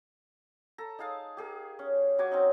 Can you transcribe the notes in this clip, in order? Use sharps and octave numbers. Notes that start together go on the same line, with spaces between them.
A4 A#5
D#4 G#4 F5 A5
G4 G#4 A#4
C#4
F#3 F#4 G#5 D6
C4 C#4 D#4